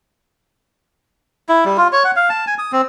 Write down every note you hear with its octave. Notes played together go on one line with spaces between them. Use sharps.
E4
G3
F4
C#5
F#5
F5
A5
G#5
D#6
C4